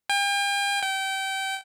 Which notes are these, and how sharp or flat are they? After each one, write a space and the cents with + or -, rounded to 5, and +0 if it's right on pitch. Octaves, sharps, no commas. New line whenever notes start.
G5 +40
G5 -25